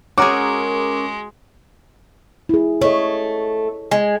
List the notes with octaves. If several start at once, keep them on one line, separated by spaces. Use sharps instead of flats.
G#3 C#4 F#4 G#4 A#4 C#6 D6
E4 G#4
A3 C#5 D#5
G#3